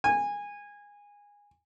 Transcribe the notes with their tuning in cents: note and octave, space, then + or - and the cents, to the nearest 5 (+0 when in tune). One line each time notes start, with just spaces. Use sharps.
G#5 -20